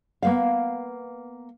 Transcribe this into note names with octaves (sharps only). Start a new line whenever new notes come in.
A#3 B3 F5